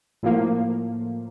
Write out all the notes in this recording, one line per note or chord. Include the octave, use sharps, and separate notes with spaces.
A2 F3 A#3